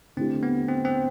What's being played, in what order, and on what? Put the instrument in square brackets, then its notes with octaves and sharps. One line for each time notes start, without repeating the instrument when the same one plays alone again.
[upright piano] D3 A3 E4 G4 [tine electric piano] C4
[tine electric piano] B3
C4
C4